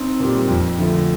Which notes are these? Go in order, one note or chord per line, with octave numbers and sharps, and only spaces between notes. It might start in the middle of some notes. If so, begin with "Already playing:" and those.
Already playing: C4 D#4
A#2 G3
F2
D3 F3 A3